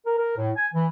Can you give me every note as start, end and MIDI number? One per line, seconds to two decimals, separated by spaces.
0.06 0.15 70
0.19 0.35 70
0.38 0.51 45
0.56 0.68 80
0.75 0.88 52